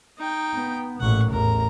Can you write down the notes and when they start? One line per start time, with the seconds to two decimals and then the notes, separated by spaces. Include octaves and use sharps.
0.18 D#4 G5
0.54 B3
1.01 A1 A#2 F#5 C#6
1.30 A1 E2 A#4 A#5